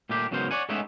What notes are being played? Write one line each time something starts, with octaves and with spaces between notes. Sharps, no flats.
A#2 G3 A3 D4 G4
G#2 C#3 F#3 B3 A#4 C5
C#5 D5 F#5 G#5
G#3 A3 B3 C#4 D#4 E4